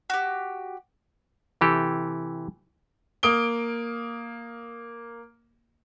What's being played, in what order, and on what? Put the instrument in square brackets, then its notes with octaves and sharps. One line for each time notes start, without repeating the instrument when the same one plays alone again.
[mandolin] F#4 G4
[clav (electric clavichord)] C3 E3 G4 A4
[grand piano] A#3 D#6 D7 G7